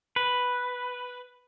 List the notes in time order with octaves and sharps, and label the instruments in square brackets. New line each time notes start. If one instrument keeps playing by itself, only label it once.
[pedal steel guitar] B4